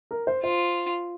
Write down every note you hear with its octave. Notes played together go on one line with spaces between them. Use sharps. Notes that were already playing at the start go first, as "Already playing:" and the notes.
A#4
C5
F4 C5